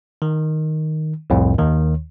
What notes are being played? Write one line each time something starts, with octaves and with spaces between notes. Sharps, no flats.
D#3
C2 F2 A2
D#2 D#3